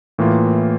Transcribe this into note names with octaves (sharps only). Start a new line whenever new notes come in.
A2 E3 A#3 F4